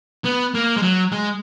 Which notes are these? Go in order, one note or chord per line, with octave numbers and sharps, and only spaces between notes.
B3
A#3
G#3
F#3
G#3